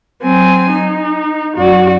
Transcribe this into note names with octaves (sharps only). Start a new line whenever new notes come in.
F#3 C4 G#5
D#4
F#2 F#4 D5